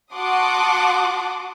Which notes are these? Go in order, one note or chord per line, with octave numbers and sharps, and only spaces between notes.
F#4 F#5 A5 C6 D6 D#6